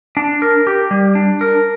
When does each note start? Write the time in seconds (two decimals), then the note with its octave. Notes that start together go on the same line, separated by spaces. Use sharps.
0.17 D4
0.42 A#4
0.67 G4
0.91 G3
1.15 D4
1.41 A#4